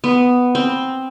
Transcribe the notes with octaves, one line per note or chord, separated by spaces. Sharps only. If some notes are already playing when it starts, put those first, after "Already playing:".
B3
C4